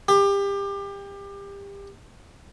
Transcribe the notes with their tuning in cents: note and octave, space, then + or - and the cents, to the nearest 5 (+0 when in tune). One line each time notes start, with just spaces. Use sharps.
G4 +25